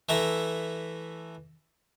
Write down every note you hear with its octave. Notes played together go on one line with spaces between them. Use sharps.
E3 A3 E5 A#5